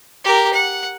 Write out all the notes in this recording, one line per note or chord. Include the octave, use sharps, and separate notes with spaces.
G4 A#4
F#5